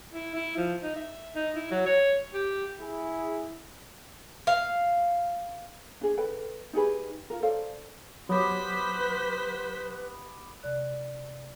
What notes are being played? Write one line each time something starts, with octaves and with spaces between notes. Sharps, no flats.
E4
E4
F3
D#4
E5
D#4
E4
F#3
C#5
G4
E4 G#4
F5
D4 G#4
A4 B4 G5
D#4 G4 G#4 B4
F4 A#4
A4 C5 D5 F5
F#3 B3 G4 B4 C5 B6
C3 D5 F#6